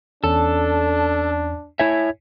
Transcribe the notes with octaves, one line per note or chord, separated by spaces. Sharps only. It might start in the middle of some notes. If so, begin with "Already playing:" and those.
E2 C#4 D4 A4
E4 C#5 E5 G#5